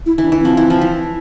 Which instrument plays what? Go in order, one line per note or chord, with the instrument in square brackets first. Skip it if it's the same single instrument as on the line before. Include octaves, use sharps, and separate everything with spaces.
[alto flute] E4
[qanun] E3 [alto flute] D4
[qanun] E3
[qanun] F3 [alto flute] C4
[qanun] E3
F3
E3